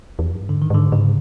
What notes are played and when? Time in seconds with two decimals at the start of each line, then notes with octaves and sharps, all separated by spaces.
0.19 E2
0.26 F2
0.34 F#2
0.41 G2
0.49 G#2 D3
0.62 D#3
0.70 G#2 D3
0.92 G#2 C#3